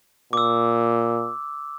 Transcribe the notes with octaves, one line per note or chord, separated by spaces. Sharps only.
A#2 D6 E6